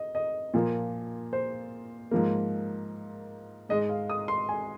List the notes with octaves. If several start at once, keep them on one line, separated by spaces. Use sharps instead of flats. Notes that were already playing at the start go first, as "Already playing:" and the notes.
Already playing: D#5
D#5
A#2 F3 A#3
C5
G#2 F3 A#3
G#2 G#3 D#5
F5
D#6
C6
G#5